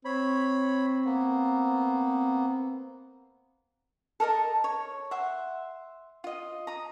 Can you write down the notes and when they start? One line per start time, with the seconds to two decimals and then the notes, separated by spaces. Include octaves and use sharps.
0.05 C4 C#5 B5
1.05 A#3 B3
4.20 A4 A#4 D#5 A5
4.64 C#5
5.11 E5 F#5 C6
6.24 F4 D#5
6.67 A#5 D#6